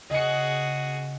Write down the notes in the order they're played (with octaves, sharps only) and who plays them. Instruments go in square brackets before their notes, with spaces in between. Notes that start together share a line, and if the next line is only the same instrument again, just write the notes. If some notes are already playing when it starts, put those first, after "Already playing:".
[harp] C#3 [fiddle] F#4 G#4 [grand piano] D#5 C#7